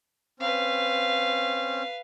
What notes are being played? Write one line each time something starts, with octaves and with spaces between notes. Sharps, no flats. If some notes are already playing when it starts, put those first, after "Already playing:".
C4 C#4 B4 F5